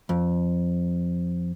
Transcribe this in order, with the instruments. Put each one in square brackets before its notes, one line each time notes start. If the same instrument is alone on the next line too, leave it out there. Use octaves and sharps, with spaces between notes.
[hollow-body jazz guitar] F2